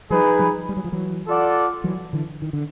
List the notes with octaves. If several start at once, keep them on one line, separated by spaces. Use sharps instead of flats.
F3 G3 D#4 G#4 B4
F3 G3
G3
F#3
F3
E3 F#3
F4 A4 D5 F#5
E3 F#3
D3 E3
D#3
D3